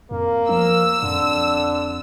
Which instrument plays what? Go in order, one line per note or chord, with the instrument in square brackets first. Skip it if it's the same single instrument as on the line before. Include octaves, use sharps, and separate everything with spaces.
[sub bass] F2 [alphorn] A#3
[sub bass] F3 [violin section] E6
[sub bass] F2 [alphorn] D3